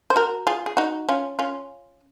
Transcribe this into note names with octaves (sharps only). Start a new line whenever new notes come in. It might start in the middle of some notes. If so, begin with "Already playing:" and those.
C5
F#4 A#4
F4 G#4
G#4
D#4 F#4
C#4 F4
C#4 F4